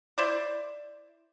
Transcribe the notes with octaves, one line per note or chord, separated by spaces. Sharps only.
E4 C5 D5